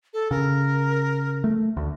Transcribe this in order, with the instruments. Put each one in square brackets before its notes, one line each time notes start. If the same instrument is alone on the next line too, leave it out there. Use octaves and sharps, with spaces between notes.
[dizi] A4
[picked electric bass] C#3 [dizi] A#4
[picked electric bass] A3
D2